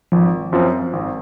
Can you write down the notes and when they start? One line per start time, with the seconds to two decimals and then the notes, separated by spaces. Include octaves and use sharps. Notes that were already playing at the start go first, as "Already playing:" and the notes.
0.12 G#1 F3
0.52 F#2 F3 C4
0.93 G#1